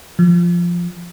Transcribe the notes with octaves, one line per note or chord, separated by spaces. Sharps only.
F3